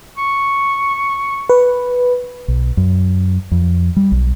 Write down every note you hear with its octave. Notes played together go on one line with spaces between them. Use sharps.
C#6
B4
B1
F#2
F2
G3
B1